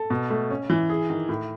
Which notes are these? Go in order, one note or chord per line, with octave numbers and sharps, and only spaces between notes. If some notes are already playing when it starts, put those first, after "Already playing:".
Already playing: A4
B2
A3
C#4
E3
G#4
D#3
A2